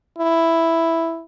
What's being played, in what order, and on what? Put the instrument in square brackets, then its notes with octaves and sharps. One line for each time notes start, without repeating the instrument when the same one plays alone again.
[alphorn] E4